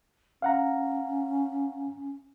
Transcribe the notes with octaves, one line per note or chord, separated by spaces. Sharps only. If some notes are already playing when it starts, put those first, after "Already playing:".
C#4 F5 F#5 A#5